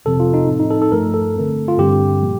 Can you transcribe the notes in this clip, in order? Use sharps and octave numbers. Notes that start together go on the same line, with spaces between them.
F2 C3 F3 C4 A4
F4
D#4
A2 F3 C4
D#4
A4
A4
G2 F3 A3 A#4
A4
D3 A3 C4
F4
G2 D3 G3 C4 G4
A#2 F3 A#3